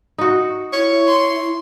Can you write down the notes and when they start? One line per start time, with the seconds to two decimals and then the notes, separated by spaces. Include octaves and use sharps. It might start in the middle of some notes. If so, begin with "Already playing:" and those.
0.18 D#4 F#4
0.73 E4 C#5
1.07 C6